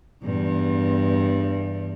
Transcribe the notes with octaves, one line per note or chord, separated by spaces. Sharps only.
E2 G2